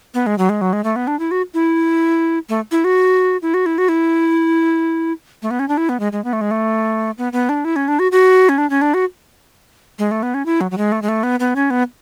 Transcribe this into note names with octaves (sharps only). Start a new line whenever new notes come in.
B3
G#3
F#3
G#3
F#3
G#3
A3
B3
D4
E4
F#4
E4
A3
E4
F#4
E4
F#4
E4
F#4
E4
A3
B3
C#4
D4
E4
B3
G#3
G#3
B3
A3
G#3
A3
B3
B3
D4
E4
C#4
D4
F#4
F#4
C#4
D4
C#4
D4
F#4
G#3
A3
B3
C#4
E4
F#3
F#3
G#3
A3
G#3
A3
B3
B3
C#4
B3